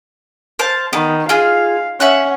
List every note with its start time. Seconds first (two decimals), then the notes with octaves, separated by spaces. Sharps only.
0.59 C5 F5 A5
0.93 D#3 B3
1.29 F4 G#4 F5
2.00 C#4 E5 F#5 F#6